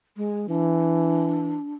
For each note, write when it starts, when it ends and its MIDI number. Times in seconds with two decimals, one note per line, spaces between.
0.17 0.49 56
0.49 1.57 52
0.49 1.75 62